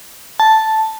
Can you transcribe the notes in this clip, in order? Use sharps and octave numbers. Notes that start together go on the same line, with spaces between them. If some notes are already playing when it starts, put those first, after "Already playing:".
A5